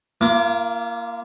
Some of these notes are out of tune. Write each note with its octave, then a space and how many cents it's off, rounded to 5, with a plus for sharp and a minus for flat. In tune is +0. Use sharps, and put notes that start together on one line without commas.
A#3 +0 F4 -45 D6 +0